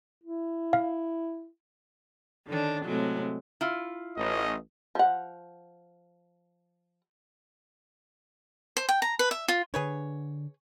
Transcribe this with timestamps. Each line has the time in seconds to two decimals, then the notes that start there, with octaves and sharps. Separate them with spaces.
0.23 E4
0.73 F5
2.47 D3 D#3 C#4 D4
2.85 A2 C3 F#3 G#3
3.61 E4 F4
4.17 A1 D#5
4.95 F3 F#5
8.77 C5
8.89 G5
9.02 A#5
9.19 B4
9.31 E5
9.48 F4
9.74 D3 D4 G#4 B4 C#5